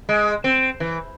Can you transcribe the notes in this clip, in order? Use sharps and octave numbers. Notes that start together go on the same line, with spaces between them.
G#3
C4
E3